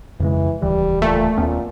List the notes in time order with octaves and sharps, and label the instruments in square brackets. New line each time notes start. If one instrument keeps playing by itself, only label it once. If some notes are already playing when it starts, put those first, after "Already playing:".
[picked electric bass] F2 C#3 G#3 [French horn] E3
[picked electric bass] D#1 C#2 E3 [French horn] G3
[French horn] A#2 [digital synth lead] A3
[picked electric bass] D#2 B3 C#4 [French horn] A#2